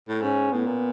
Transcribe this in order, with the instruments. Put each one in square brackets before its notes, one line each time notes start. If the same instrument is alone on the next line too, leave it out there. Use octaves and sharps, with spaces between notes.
[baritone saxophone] A2
[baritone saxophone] G#2 [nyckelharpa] C#4
[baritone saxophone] A2 [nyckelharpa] B3
[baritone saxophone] A#2